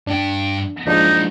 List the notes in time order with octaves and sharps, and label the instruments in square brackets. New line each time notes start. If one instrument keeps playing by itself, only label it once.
[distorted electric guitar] G2 G5 [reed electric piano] D4
[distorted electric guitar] A#2 E3 [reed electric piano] F3 G#3 D4 [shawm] D#4